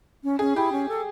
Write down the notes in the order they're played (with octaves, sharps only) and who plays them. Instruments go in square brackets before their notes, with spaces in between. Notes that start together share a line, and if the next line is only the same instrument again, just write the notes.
[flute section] C#4
[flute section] C#4 [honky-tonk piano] G#4
[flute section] E4 [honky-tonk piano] G4
[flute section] C#4
A4